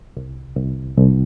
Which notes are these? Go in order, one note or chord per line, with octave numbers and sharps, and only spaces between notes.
C2
C2
C2